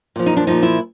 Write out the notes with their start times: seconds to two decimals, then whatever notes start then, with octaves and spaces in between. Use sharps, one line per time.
0.16 A#2 F3
0.26 D#4
0.37 D4
0.47 A#2 F3 D#4
0.63 E4